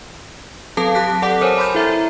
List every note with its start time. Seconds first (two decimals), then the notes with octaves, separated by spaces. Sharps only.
0.77 F#3 C4 A4 F5 A5
0.95 G4 A5 F#6 B6
1.22 A4 D5 F#5 A5 D6
1.41 A#4 C5 C#5 G#5
1.58 B5 C6 F6 G6
1.75 E4 A4 E5 A#5